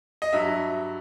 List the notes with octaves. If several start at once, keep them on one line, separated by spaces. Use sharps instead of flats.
D#5
G2 F#3 E5